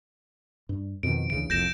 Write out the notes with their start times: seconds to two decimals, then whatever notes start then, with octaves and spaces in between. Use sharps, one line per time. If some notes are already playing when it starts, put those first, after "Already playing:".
0.69 G2
1.03 F2 B2 D#3 D7
1.30 D2 C#3 E3 D7
1.50 F1 C2 F2 G6 A#6 E7